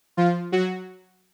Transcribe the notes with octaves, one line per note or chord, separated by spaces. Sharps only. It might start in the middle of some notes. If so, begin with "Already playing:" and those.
F3 F4
F#3 F#4